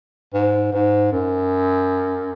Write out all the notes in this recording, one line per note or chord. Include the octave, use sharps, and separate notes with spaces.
G#2
G#2
F#2